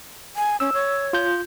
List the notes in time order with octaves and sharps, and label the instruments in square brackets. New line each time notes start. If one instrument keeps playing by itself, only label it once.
[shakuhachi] G#5
[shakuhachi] C#4 [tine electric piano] E6
[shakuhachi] C#5
[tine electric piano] F4 G6